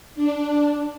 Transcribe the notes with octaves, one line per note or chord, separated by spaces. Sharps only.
D4